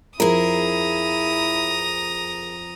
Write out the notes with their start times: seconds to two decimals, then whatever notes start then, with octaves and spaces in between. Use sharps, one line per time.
0.20 F2 E4 G#4 A#4 A#5 D#6